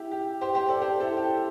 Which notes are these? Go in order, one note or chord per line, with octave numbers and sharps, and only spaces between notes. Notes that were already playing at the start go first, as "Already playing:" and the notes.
Already playing: E4 G4
G4
G4 C5
G4 C5
A4 D5
G4 C5
E4 A4
G4